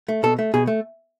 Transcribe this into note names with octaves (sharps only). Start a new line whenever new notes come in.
A3
B2 A4
A3
B2 G#4
A3